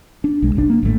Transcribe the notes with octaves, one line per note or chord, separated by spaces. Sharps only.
D4
B1 G#3
G1 C2 D4
A#3 C4 D4
G#1 A2 D#3 A3